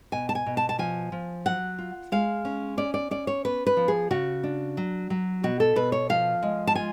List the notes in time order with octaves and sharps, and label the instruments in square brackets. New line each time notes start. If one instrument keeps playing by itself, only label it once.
[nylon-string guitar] B2 G#5
A5
G#5
B2
A5
A5
F3 G#5
F3
F#3 F#5
F4
G#3 F5
C#4
C#4 D5
D5
C#4 D5
C#5
B3 B4
B4
F3
G#4
C#3 F#4
D4
F#3
F#3
B2 F#4
A4
B2 B4
C#5
F3 F5
G#3
A5
F4 G#5